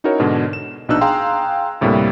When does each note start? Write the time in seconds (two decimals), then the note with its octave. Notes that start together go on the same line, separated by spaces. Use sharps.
0.04 C#4 D#4 E4 F#4 A#4 C#5
0.19 G#2 B2 D3 D4
0.53 E7
0.89 A#1 B2 D4 D#4 E6 F#6
1.01 G#4 F5 G5 A#5 C6
1.81 D2 A2 C3 G3 A#3